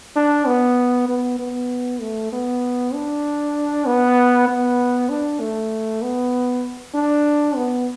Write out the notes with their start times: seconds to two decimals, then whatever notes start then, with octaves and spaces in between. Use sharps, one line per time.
0.16 D4
0.46 B3
1.09 B3
1.39 B3
2.01 A3
2.32 B3
2.94 D4
3.86 B3
4.48 B3
5.09 D4
5.40 A3
6.02 B3
6.95 D4
7.56 B3